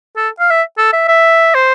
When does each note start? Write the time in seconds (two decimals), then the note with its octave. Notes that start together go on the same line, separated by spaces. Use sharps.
0.17 A4
0.40 F5
0.50 E5
0.78 A4
0.93 E5
1.08 E5
1.55 C5